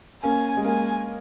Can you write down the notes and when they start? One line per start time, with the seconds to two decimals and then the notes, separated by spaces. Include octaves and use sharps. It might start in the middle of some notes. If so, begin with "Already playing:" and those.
0.23 A#3 C#4 G#5
0.57 G#3
0.65 A#3 G#5